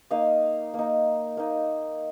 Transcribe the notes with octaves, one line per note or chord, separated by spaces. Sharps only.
A#3 D#4 D#5 F5
A#3 D#4
A#3 D#4